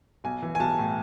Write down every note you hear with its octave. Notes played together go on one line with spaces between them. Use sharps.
B1 G#5
E3
G#5
B1 A5
A2